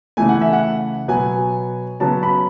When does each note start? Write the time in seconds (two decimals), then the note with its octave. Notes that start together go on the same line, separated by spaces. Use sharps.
0.17 C#3 E3 A3 G#5
0.29 F#5
0.41 E5
0.53 F#5
1.08 B2 F#3 B3 G#5
2.00 C#3 F#3 B3 A5
2.23 B5